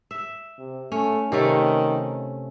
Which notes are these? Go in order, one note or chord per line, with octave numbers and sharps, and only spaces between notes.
E5
C3
A3 C#4
C3 D#3 A3 C#4